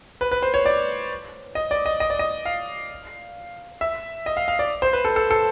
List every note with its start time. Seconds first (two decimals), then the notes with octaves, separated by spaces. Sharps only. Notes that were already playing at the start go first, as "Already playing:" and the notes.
0.21 B4
0.32 B4
0.43 C5
0.54 C#5
0.66 D5
1.55 D#5
1.71 D5
1.86 D#5
2.00 D#5
2.10 D5
2.19 D#5
2.45 F5
3.81 E5
4.26 D#5
4.37 F5
4.48 F5
4.59 D5
4.82 C5
4.93 B4
5.05 A4
5.16 A4
5.31 A4